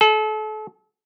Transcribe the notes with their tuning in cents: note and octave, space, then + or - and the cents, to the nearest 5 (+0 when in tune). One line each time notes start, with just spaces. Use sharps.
A4 -35